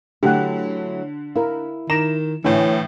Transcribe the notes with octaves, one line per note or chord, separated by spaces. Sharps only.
D3 F#3 A3 E4 G4 F#5
E4 A#4 F5
D#3 A#5 D6 E7
A2 D3 E3 C#5 G#5